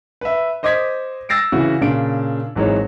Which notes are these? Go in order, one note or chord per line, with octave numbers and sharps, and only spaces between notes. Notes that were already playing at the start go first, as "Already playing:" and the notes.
B4 E5
C5 D#5 D6 D#6 G#6 B6
E6 A6 A#6 C7 D7
C#3 E3 E4 F#4
A#2 C#3 D4 D7
G#1 E3 F#3 D#4 G#4 C#5